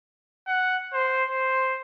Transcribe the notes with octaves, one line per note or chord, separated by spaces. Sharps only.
F#5
C5
C5